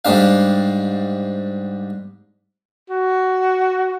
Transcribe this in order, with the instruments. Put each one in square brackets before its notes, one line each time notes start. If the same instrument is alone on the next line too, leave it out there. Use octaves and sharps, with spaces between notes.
[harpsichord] G#2 G3 D4 F5
[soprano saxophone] F#4